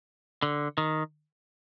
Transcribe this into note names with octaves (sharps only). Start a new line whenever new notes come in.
D3
D#3